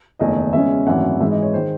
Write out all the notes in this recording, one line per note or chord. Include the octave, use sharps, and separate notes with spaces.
F#1 E2 D#3 A3 D#5
E2 C#3 G#3 C#4 E5
G#1 F#2 E3 A3 F#5
G#2 E3 G#3 E5
D#5
C#5
D#3 G#3 C5